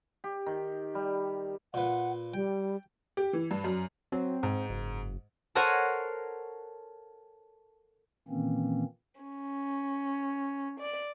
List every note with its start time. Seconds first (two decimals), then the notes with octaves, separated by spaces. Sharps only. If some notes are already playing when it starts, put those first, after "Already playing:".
0.24 G4
0.46 D#3
0.95 G3
1.74 A#2 B4 F#5
2.34 G3 G5
3.17 G4
3.33 E3
3.51 G2
3.64 F#2
4.12 F#3 C4
4.43 G#2
4.70 F#1
5.55 A4 A#4 C5 C#5 F#5 G#5
8.28 A#2 D#3 E3 A#3 C4 C#4
9.21 C#4
10.80 D5